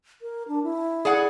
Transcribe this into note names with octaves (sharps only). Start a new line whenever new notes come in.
A#4
D4
E4
G#4 D5 F#5